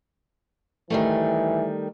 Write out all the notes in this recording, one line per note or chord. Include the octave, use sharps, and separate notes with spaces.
D#3 E3 G3 A3